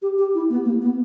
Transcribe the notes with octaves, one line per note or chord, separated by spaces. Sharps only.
G4
G4
E4
B3
A#3
B3